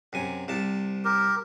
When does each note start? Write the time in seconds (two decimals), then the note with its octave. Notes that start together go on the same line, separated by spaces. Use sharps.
0.13 F#2 C3 G#5
0.48 C2 C3 A5
1.05 G4 A#4